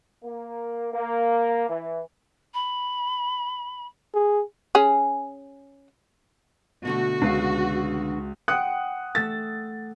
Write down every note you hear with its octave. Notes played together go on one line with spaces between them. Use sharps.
A#3
A#3
E3
B5
G#4
C#4 G#4
B2 D3 A3 F#4
C#2 D4 B4 F5
F#5 G5 C6 D#6 F#6 C#7
A3 A4 E6 A6